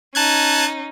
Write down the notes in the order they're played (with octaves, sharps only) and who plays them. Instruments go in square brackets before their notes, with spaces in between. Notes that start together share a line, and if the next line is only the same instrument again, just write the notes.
[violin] C#4 D#4 [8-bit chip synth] A5 F#6 G#6